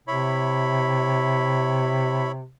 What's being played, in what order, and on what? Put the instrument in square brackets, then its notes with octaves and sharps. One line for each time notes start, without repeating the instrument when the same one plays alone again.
[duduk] C3 [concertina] E4 C#5 B5